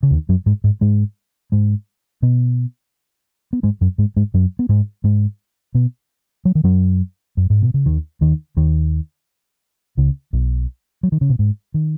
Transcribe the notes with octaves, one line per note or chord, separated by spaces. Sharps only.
C#3
D#2 D#3
F#2 F#3
G#2 G#3
G#2
G#2 G#3
G#2 G#3
B2 B3
B3
G#2 G#3
F#2 F#3
G#2 G#3
G#2 G#3
F#2 F#3
B3
G#2 G#3
G#2 G#3
B2 B3
F#3
D#3
F#2 F#3
F#2
G#2
B2
C#3
D#2 D#3
D#2 D#3
D#2 D#3
C#2 C#3
B1 B2
F#3
D#3
C#3
B2
G#2
D#3